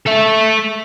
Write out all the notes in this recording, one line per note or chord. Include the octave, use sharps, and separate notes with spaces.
A4 E5